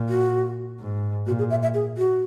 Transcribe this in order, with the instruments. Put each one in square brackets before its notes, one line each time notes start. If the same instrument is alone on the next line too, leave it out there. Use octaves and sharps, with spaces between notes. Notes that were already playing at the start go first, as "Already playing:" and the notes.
Already playing: [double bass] A#2
[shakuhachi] F#4
[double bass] G#2
[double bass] A#2 [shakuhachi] F#4
[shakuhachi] G#4
E5
E5
G#4
F#4